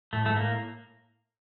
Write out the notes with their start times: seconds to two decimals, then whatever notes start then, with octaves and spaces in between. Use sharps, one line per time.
0.13 A2 A3
0.26 G#2 A3
0.36 A#3
0.41 A2